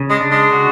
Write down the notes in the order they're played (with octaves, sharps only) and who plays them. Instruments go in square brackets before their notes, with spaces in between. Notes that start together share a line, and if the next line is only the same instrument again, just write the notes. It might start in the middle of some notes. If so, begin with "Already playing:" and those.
Already playing: [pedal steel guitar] C#3
[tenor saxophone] G#3
[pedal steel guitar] D4
[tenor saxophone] G#3
[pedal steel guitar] F#4